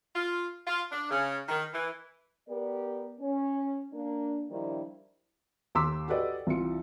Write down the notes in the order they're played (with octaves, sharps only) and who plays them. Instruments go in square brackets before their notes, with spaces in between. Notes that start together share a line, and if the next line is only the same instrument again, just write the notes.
[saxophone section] F4
F4
D4
C#3
D#3
E3
[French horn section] B3 G4 A#4 D5
C#4
A#3 D4
D#3 F3 G3 D4 E4
[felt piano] D#2 C6 D6 E6 B6
F#4 G4 A4 B4 D5 D#5
C2 E3 F4 C#7